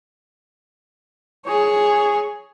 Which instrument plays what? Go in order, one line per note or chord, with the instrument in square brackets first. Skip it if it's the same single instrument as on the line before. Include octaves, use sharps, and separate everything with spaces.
[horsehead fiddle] G#4 C#5